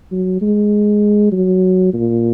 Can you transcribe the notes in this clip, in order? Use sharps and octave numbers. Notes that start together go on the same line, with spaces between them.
F#3
G#3
F#3
A#2